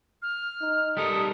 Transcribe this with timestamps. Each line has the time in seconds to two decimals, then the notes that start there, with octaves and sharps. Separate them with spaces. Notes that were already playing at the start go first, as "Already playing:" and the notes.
0.22 F6
0.62 D#4
0.97 G3 A4 A#4 D#6